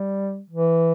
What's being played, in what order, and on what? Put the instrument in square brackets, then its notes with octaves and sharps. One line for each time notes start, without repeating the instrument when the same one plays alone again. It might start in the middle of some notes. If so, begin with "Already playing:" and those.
Already playing: [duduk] G3
E3